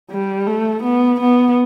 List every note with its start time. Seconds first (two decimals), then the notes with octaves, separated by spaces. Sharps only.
0.10 G3
0.47 A3
0.83 B3
1.21 B3